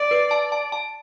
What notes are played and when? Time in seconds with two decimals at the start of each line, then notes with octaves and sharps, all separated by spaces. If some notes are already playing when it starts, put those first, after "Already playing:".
Already playing: D5
0.11 B4
0.31 A5
0.52 A5
0.72 A5